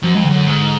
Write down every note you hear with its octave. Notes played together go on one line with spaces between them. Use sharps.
F#2 F3
F2 G#3
D3
F#2
D3
G#2